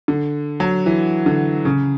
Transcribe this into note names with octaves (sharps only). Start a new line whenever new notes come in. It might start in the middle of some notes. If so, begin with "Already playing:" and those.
D3
F#3
E3
D3
C#3